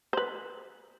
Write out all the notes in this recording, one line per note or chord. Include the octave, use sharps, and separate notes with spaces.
B4 C5